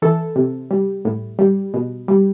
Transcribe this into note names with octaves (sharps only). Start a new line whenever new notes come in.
E3 A4
C3
G3
A2
G3
B2
G3